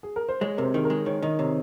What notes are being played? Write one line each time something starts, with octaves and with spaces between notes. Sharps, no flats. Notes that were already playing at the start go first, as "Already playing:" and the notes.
G#4
A#4
C5
G#3 C#5
C3 A#4
C5
D#3 G#4
A#4
G#3
D#3 C#5
D#3 D#5
C3 C#5